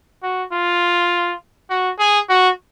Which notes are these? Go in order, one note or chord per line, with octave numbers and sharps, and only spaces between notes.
F#4
F4
F#4
G#4
F#4